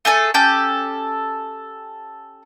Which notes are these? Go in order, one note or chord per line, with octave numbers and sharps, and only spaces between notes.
A3 G#4 A4 G#5
C#4 G4 A4 G6